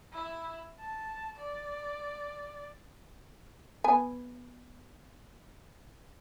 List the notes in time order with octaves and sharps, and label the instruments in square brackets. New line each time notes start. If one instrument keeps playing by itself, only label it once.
[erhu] E4
A5
D5
[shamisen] B3 G#5